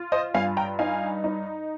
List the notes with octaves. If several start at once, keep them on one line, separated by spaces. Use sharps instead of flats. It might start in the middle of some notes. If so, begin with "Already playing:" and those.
Already playing: F4
C5 D#5
G2 F5 G#5
G5 A#5
D#4 F5 G#5
D#4